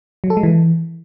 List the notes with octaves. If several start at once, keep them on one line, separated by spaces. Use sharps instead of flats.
F#3
A4
G#3
E3